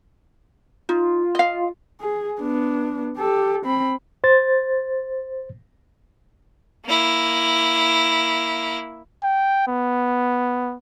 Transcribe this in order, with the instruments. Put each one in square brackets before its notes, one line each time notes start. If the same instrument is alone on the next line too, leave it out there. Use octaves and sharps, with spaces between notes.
[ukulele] D#4 [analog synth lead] F4
[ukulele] D#5 F5
[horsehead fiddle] G#4
B3 D4
G4 A4
C4 B5
[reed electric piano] C5 A6
[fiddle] A#3 E4
[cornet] G5
B3